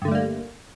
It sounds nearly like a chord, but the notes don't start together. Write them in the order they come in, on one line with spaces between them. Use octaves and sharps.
G2 D3 A3 G3 A#3